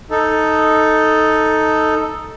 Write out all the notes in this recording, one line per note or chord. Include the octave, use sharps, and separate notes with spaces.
D#4 A4